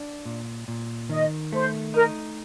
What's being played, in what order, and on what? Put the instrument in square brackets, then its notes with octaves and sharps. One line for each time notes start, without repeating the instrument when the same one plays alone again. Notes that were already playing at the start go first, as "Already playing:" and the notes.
Already playing: [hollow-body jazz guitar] D4
A#2
A#2
[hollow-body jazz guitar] D#3 [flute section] D#5
[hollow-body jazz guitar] A3 [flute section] C5
[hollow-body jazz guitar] D#4 [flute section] A#4